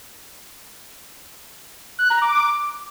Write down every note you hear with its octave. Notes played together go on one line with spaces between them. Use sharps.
F#6
A#5
D6